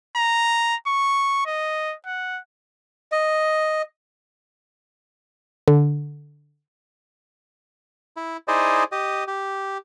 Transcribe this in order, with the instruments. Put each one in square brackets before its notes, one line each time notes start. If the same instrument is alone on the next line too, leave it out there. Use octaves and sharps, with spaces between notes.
[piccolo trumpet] A#5
C#6
D#5
F#5
[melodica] D#5
[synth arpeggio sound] D3
[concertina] E4
D#4 E4 G#4 C5 D5 D#5
G4 D#5
G4